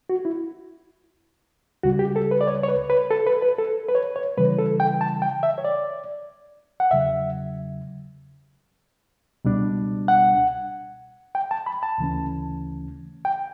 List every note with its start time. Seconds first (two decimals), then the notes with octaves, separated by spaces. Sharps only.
0.10 F#4
0.25 E4
1.83 C#2 C#3 G3 F#4
1.99 G4
2.16 A4
2.31 B4
2.41 D5
2.47 C#5
2.63 C#5
2.69 B4
2.90 B4
3.11 A4
3.27 B4
3.42 B4
3.58 A4
3.88 B4
3.95 C#5
4.16 C#5
4.38 C#3 E3 G3 B4
4.58 A4
4.80 G5
5.01 A5
5.22 G5
5.43 E5
5.58 C#5
5.65 D5
6.80 F#5
6.91 E2 C#3 F#3 E5
9.45 C#2 B2 G3 D4
10.08 F#5
11.35 G5
11.51 A5
11.66 B5
11.83 A5
11.98 D2 C#3 E3 A3 C#4
13.25 G5